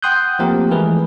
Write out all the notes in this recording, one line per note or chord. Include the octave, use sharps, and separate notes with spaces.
F#5 G5 C6 D#6 F#6 G6
F3 A3 A#3 C4 G4 A#4
E3 G#3 A3 G#4 A#4 B4